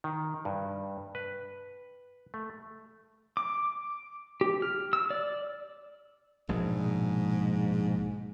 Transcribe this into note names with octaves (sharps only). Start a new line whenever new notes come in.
D#3
G2
B4
A3
D6
G4
F6
E6
D5
A#1 G#2 B2 G#3